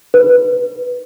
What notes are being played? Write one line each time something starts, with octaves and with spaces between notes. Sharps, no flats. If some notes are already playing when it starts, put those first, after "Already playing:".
B4